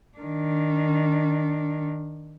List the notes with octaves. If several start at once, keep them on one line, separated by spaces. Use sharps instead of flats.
D#3 D4